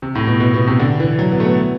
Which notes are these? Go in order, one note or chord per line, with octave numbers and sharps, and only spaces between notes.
C3
A2
B2
B2
B2
C3
D3
E3
F#3
B3
A3
B3